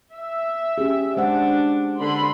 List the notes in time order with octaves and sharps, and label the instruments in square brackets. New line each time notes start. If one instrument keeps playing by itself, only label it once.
[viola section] E5
[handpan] C#4 G4 G#4
[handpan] G#3 C5 F#5 [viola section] D4
[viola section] D3 B5 C6